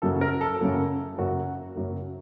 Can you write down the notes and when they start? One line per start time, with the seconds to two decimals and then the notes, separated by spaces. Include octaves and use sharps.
0.02 F#2 C#3 F#3 A#3 A4
0.21 A#4
0.41 A4
0.60 F#2 C#3 F#3 A#3
1.18 F#2 C#3 F#3 A#3 F#4
1.76 F#2 C#3 F#3 A#3